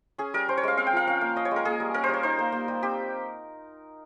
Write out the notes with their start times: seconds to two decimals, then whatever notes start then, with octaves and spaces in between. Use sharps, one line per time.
0.18 C#4 G#4
0.34 G3 A#4
0.48 C#4 C5
0.57 C#5
0.63 G#3 F5
0.77 C4 F5
0.87 G5
0.93 F3 F5
1.07 C#4 F5
1.21 A#3
1.36 C#4 D#5
1.45 C#5
1.51 G#3 A#4
1.65 A#3 G#4
1.80 G3
1.94 C#4 A#4
2.04 G3 C5
2.14 C#5
2.23 D#4 C5
2.39 A#3
2.52 A#3
2.68 G3
2.82 C4 G4